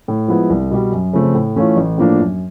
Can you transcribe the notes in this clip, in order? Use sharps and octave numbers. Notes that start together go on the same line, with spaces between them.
A2
F3 G#3 B3 E4
C2
B2 G3
F#2
C#3 F3 A3 C4
A2
E3 A3 C#4 F4
A1
A2 F3 A#3 D4
F#2